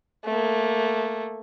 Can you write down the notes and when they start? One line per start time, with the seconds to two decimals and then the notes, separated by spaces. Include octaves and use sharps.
0.25 A3 A#3